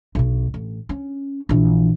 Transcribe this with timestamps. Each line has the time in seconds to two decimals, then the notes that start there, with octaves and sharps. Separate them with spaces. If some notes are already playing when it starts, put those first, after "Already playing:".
0.15 B1 B2
0.54 A1
0.89 C#4
1.49 A#1 E3